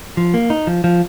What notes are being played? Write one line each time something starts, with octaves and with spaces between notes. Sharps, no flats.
F3
A#3
D#4
F3
F3